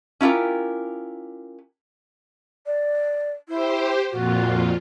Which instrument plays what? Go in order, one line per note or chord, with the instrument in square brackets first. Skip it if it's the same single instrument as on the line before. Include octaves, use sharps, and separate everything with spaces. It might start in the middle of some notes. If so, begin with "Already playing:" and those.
[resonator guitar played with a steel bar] C#4 E4 F4 G4 A#4
[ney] D5
[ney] E4 [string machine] G4 C5
[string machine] F2 A#2 F4 [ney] F#4